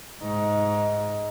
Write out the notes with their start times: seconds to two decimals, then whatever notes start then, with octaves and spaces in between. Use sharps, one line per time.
0.21 G#2 D#4